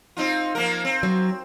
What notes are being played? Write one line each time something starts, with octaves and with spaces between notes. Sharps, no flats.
C4 D#4 F4
F3 A#3 A#4
C4
F#3